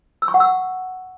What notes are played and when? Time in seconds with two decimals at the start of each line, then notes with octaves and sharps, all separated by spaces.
0.22 E6
0.28 C#6
0.34 F#5
0.40 E6